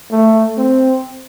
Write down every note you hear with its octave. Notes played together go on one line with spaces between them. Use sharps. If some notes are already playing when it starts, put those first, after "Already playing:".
A3
C4